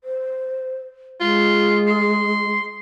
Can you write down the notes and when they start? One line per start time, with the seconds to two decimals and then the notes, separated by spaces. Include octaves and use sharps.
0.04 C5
1.21 G#3 F4
1.87 C6